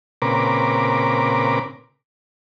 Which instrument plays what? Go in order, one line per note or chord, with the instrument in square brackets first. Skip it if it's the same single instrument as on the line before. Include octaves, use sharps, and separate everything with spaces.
[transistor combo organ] A#2 C#3 C4 A#4 B4 D6